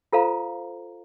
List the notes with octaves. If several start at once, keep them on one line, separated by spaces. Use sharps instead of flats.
F4 A4 C5 F5 A#5